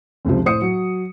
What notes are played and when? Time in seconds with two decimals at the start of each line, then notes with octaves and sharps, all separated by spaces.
0.25 F1 C#2 C3 F3
0.45 A2 E4 C5 D#6 C#7
0.62 F#3